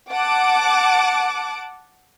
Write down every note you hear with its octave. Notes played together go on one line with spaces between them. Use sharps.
F#5 A5 D6 D7